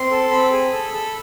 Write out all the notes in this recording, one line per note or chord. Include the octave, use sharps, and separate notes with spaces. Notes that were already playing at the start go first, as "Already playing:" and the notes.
Already playing: C4 C6
A4
C4 B5
G#4
A4
A4